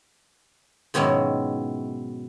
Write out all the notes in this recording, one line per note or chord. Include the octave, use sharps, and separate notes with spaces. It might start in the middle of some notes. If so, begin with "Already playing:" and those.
G#2 B2 D#3 F#3 C#4 E4